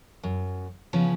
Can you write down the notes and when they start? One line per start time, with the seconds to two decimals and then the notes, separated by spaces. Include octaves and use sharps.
0.23 F#2
0.93 C#3 F3 B3 C#4